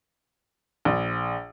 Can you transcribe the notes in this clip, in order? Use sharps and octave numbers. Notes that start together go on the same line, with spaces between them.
A#1